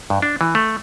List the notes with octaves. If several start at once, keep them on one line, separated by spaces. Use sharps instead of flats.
G2
D4
E3
A3